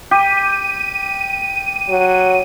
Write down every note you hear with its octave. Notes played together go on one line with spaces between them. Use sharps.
G4 D#7
F#3